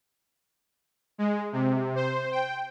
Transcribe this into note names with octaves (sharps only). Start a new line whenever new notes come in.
G#3
C3
C5
G5